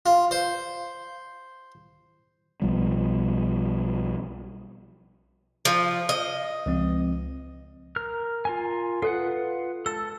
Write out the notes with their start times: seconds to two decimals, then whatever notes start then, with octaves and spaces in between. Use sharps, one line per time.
0.06 F4
0.31 C5
2.62 B1 B2 F3 G3
5.65 F3
6.09 D#5
6.66 C#2 F3 C4
7.96 A#4 F6
8.45 F4 A#4 G#5
9.02 F4 A4 B4 F#5
9.86 A4 A5 E6